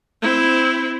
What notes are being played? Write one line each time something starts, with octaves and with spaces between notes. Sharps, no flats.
C4 E4